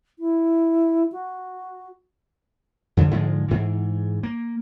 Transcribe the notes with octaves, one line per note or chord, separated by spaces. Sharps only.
E4
F#4
F2 D3
G#2 D3 F3 G#3
G#2 E3
A#3